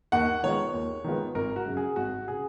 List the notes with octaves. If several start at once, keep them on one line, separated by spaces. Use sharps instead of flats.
D#2 F#5
D#3 G#3 B3 F4 C#5
D#2
D#3 G#3 B3 F4
G#1 A#4
F#4
F#2 C#3
G#4
G#1 F#4
C#3 G#4